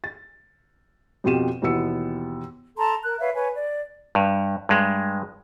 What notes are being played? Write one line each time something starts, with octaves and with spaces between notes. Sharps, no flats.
A6
F2 B2 F4 G4 D#7 E7
D#2 B2 E3 B3 E6 C#7
A4 A5 A#5 C6
A#4 F#6
B4 C#5 E5 F5
B4 C#5 G#5
D5
G2
G2 G#3